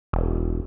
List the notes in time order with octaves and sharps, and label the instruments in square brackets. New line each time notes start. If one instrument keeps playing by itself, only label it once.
[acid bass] E1